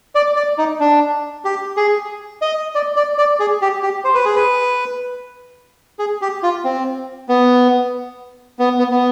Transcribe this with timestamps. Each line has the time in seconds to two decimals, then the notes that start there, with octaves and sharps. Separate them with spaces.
0.15 D5
0.36 D5
0.58 D#4
0.80 D4
1.45 G4
1.77 G#4
2.42 D#5
2.75 D5
2.96 D5
3.18 D5
3.40 G#4
3.62 G4
3.83 G4
4.04 C5
4.15 B4
4.25 G#4
4.35 B4
5.99 G#4
6.21 G4
6.43 F4
6.64 C4
7.29 B3
8.59 B3
8.79 B3
8.91 B3